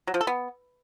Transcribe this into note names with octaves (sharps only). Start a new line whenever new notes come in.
F#3
F3
A4
B3